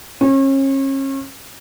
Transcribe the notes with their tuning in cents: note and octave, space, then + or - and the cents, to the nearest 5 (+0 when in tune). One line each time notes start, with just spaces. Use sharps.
C#4 -35